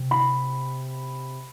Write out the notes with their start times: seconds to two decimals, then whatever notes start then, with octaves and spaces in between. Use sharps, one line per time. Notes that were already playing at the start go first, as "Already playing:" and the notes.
Already playing: C3
0.11 B5